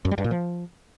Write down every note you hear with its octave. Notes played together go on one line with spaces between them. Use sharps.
F#2
G3
G2
A#2
F3